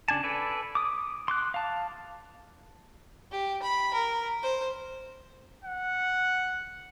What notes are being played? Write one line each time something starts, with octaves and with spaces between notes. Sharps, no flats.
C#3 D4 G#5 A5
A4 B4 D5 G#5
D6 D#6
C6 D6 F#6
F5 A5
G4
B5
A#4
C5
F#5